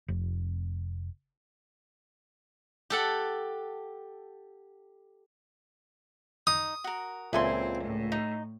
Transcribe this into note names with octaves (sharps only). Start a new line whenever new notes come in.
F1
G4 A4 F#5
D#4 D#6
F#4 A#4
C#2 A#2 C4 E4 A4 G#5 C6
A2
D#4